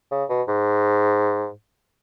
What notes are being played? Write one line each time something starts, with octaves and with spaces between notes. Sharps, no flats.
C#3
B2
G#2